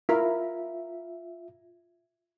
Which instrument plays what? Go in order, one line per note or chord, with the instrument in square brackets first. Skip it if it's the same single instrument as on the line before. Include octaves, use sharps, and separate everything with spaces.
[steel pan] E4 A#4 [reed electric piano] F4 E5